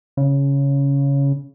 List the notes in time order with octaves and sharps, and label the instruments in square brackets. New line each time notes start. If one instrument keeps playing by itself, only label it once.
[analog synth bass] C#3